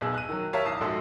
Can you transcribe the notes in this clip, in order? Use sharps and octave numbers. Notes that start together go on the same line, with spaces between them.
B1 B2 G#4 E6
F#6 D#7
D#3 F#3
G4 A#4 C#5 E5 F5 A5
B1 E2 A5 D#6 C7
A#1 G#2 F#4 A4 C6